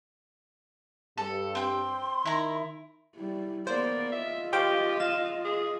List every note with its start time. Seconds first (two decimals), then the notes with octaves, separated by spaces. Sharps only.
1.18 G2 A4
1.55 C4 G5 C6
2.26 D#3 D#4 E4 A#5
3.16 G3 E4
3.67 A#3 B3 C5 D5
4.12 F4 D#5 E5
4.53 G4 C5 F5 G5
5.00 F5 E7
5.45 G#4